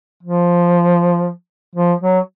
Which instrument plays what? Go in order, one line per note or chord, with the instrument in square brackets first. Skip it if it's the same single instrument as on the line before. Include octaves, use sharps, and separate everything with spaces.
[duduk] F3
F3
F#3